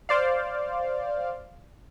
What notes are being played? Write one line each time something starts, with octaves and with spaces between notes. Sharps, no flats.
C5 D5 F5